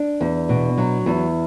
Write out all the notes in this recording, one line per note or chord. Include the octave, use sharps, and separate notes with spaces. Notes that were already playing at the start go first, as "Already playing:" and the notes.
Already playing: D4
E2
B2
F#3
E2